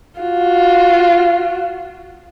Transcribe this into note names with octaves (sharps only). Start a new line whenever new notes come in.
F4 F#4